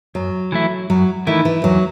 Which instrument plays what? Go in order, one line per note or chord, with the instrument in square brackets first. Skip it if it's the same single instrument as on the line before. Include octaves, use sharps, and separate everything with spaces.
[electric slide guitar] F#2 [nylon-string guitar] F#3
[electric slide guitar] E3 A3 E4
[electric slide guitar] F#2 [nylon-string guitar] F#3
[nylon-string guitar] D#3 [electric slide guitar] E3 A3 E4
[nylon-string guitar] E3
[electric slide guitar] E2 [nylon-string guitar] F#3